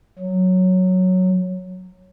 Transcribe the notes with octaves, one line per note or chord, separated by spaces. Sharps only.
F#3